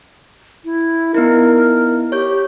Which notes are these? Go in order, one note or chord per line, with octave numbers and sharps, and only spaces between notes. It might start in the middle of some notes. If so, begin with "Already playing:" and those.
E4
B3 D#4 E4 A#4
G4 C#5 G6